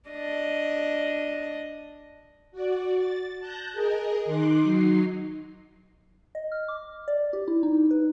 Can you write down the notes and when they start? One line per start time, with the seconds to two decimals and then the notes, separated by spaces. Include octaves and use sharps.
0.10 D4 D#5
2.51 F#4 D5
2.95 A6
3.40 A5 F#6 G6 A#6
3.72 G#4 A#4 D#5
4.25 D#3 D#4 C6 D6 F#6
4.62 F#3 D#4 C7
6.35 D#5
6.52 F6
6.68 D6
7.08 D5
7.33 G4
7.48 E4
7.63 D#4
7.91 B4